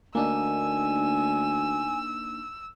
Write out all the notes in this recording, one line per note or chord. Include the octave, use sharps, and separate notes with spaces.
D2 A#3 D4 D#4 G#5 E6